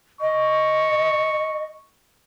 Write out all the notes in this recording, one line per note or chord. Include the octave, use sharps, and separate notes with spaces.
D#5 C#6